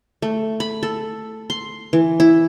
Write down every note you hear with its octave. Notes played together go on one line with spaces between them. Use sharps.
A3
B5
A4
C6
E3
E4